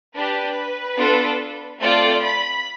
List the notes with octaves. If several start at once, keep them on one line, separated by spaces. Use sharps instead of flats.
D4 G4 B4
B3 D4 F4 A4
A3 C4 F4 A4 D5
B5